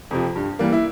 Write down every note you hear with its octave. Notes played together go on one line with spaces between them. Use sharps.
F2 C3 F3
G2
E3 G3 A#3
E4